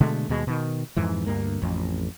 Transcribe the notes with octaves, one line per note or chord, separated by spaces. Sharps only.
B2 D3 G#3 A3
D#2 B2 G#3
B2 D#3
F2 G#2 E3
D2 G2 A#3
A1 F2